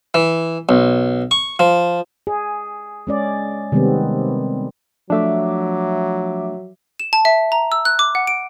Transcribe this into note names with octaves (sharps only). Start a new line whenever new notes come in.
E3
B1
C#6
F3
G#4
G#3 C#4 D5
C3 D#3 G3 G#3 B3 C4
F3 F#3 A3 D4 E5 D6
E7
A5
E5
A#5
E6
F#6
D6
F#5
D7